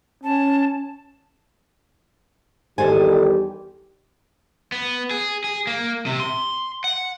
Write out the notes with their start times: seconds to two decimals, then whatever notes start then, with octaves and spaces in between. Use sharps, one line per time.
0.24 C#4 A5
2.78 E2 D#3 G3 G4 A4 C5 G#5
4.72 B3
5.11 G#4
5.44 G#4
5.67 A#3
6.06 C3
6.20 C6
6.84 F#5